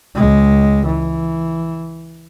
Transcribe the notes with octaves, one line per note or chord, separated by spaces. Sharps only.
C#2 G#3
E3